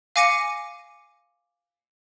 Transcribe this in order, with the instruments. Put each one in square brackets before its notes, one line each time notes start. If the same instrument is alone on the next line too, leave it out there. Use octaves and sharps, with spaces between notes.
[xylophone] F5 G#5 D6 A#6 C#7 D#7